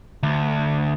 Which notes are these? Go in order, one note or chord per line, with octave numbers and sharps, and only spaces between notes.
D2